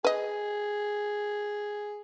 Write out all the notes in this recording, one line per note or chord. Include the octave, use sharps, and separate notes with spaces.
G#4 B4 D#5